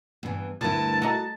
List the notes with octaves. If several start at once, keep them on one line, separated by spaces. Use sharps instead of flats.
G2 E3 B3
D2 G2 D3 E4 A#4 B4 A5
F#4 A4 D#5 A#5